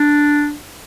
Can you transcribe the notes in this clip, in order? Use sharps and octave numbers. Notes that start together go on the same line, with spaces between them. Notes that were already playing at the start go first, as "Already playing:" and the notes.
Already playing: D4